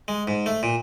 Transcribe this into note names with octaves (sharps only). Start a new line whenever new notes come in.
G#3
G#2
A3
A#2